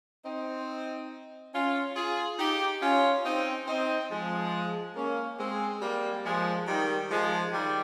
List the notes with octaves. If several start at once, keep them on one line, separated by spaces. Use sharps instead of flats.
C4 D#4
C#4 F4
F4 G#4
D#4 G4
C#4 F4
C4 D#4
C4 D#4
F3 G#3
A#3 C#4
G#3 C4
G3 A#3
F3 G#3
D#3 G3
F3 G#3
D#3 G3